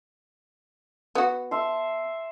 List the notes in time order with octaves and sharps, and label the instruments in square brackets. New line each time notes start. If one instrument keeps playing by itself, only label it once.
[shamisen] B3 F#4
[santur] E5 A5 C6